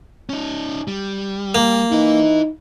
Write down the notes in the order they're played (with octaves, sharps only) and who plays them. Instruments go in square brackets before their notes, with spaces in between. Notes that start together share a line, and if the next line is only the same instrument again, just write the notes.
[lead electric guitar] C#4 D#4
G3
[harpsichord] A#3
[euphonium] D#4 [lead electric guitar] E4 B4